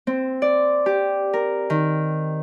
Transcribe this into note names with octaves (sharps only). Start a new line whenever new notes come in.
C4
D5
G4
A#4
D#3